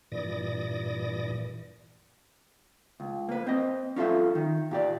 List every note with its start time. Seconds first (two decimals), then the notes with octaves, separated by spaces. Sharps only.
0.12 G2 A#2 E3 D5 D#6 A#6
3.00 C#2
3.29 A#3 B4
3.47 C4 D#5
3.96 C#4 F4 A4 E5
4.35 D#3
4.71 A#2 G4 D5